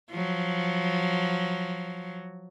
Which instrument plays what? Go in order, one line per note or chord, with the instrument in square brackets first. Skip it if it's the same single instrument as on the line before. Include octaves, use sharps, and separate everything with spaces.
[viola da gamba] F3 F#3